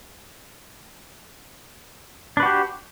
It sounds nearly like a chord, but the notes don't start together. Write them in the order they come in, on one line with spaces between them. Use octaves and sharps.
D4 B4 F#4 G4